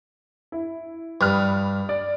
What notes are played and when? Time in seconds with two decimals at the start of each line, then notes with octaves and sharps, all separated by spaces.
0.52 E4
1.21 G2 B5 D#6 F6
1.89 D5